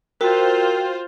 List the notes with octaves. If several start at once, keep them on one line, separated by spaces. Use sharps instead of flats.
F4 F#4 A#4 C5 G5